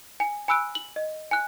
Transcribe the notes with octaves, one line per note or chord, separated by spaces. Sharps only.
G#5
G#5 B5 E6 F#6 D7
F#7
D#5
G#5 F#6